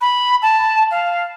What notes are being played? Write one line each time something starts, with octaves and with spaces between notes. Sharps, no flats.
B5
A5
F5